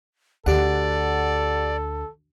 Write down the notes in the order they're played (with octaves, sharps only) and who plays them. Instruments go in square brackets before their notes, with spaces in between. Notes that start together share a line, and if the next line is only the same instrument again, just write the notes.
[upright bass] D2 [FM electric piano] G4 F#5 [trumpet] A4 [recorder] D5